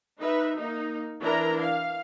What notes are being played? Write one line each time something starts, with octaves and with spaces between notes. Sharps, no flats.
D#4 B4 E5
A#3 D#4
E3 D4 E4 A#4 A#5
F5